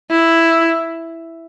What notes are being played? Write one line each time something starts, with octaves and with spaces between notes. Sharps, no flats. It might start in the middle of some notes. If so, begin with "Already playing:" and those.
E4